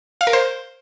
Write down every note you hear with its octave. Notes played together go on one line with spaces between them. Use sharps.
F5
A#4
C5